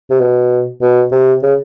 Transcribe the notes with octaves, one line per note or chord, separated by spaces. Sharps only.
C3
B2
B2
C3
C#3